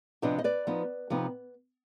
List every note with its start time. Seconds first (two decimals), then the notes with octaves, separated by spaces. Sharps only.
0.22 C3 F3 B3 D4 C5 D#5
0.39 D#5
0.44 B4 D5
0.67 F3 B3 D#4
1.10 C3 F3 B3 D#4